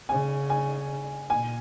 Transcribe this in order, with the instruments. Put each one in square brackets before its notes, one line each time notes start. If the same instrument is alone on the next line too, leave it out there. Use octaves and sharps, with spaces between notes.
[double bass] C#3 [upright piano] G#5
[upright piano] G#5
[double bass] A#2 [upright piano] G#5